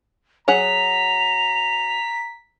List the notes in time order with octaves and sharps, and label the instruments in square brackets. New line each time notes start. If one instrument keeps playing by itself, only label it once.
[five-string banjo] F#3 G#4 F#5 [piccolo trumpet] A#5 [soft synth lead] B6 [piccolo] F7